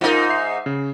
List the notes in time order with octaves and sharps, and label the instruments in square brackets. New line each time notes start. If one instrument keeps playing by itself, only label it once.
[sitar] G#2 D#4 [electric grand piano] F4 A#4
[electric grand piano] E5 C7
C#3